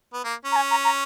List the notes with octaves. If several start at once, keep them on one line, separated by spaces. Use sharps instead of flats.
B3
A#3
C#4
A#5
G#5
A#5
A#5